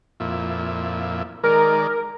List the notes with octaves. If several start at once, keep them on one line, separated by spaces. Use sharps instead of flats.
F2 A#2 E4
D#3 G#3 A#4 D5